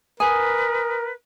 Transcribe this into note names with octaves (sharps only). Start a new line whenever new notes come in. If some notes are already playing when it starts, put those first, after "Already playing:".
A#4 B4 G#5 D#6